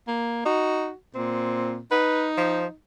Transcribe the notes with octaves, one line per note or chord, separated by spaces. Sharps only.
A#3
D#4 F#4
A#2 C4
D#4 B4
F3